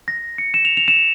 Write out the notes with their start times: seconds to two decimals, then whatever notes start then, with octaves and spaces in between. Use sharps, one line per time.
0.08 A#6
0.38 C#7
0.54 E7
0.65 F7
0.77 F7
0.88 E7